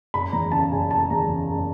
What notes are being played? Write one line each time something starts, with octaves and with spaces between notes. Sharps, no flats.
F#1 B5
E2 A#5
C#3 A5
F#1 G#5
F#1 A5
E2 A#5
C#3
F#1